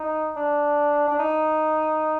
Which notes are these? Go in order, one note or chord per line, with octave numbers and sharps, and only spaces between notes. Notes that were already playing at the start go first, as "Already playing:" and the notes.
Already playing: D#4
D4
D4
D#4